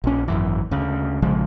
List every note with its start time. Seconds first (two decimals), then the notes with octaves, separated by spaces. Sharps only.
0.04 A#1 C#4
0.28 G#1 F#2 E3
0.71 D2 C#3
1.22 A#1 C#3 F3 G#3